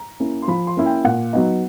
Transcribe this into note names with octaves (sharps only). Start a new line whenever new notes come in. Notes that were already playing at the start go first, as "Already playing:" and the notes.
Already playing: A#5
A#3 C#4 E4
C6
F3 B5
C6
A#3 C#4 E4
G5
A#2 F#5
F#3 B3 D#4